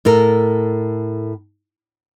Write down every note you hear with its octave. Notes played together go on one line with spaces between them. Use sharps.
A2 A4 A#4